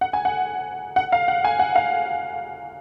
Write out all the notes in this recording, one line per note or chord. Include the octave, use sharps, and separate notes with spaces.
F#5
G#5
F#5
F#5
F5
F#5
G#5
F#5
F5